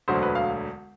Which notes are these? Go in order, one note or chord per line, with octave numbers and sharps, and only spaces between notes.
E1 D2 D3 F#3 C5
B4
F5